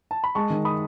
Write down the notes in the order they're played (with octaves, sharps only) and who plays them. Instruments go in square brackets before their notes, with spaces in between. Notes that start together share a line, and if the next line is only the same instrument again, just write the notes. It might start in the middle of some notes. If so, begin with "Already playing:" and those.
[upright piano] A5
B5
[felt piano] G#3 [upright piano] A5 C#6
[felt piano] D#3
[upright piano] B5 D#6